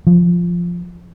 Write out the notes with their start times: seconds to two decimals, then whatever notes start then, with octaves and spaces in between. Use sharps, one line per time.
0.07 F3